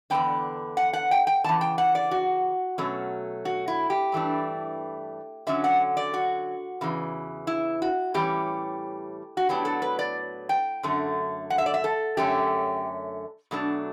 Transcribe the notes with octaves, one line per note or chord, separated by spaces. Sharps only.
E2 D3 G3 B3 D4 G5
F#5
F#5
G5
G5
E2 C#3 E3 A5
G5
F#5
D5
F#4
B2 F#3 A3 C#4
F#4
E4
G4
G2 E3 A3 D4
D3 F#3 C#4 E5
F#5
D5
F#4
E2 C#3 E3
E4
F#4
A2 E3 G3 C#4 G4
F#4
A2 F#3 B3 D4 G4
A4
B4
D5
G5
F#2 D3 A3
F#5
E5
D5
E5
A4
F#2 D3 A3 C#4 G4
B2 F#3 A3 D4